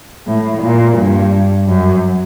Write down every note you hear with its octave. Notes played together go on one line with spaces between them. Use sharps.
A2
A#2
G2
F#2